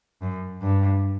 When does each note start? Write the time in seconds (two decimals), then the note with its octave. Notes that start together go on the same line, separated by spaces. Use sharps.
0.22 F#2
0.62 G2